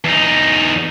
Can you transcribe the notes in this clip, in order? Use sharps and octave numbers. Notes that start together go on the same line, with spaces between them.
E2 D#4